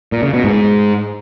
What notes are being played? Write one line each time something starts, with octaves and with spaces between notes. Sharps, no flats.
A#2
C#3
B2
G#2